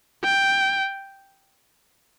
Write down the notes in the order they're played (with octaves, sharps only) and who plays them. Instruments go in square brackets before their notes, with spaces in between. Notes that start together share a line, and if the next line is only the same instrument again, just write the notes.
[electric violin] G5